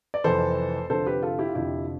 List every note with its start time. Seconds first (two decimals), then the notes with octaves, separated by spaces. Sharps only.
0.14 D5
0.24 F1 F2 E3 A4 C5
0.90 F1 F2 D3 F3 A4 C5
1.07 G4 B4
1.22 F4 A4
1.39 E4 G4
1.49 F4
1.55 F1 F2 D3 F3 E4 G4